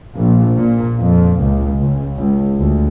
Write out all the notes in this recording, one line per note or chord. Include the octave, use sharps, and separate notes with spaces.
A#1
A#2
F2
C#2
C#2
C#2
D2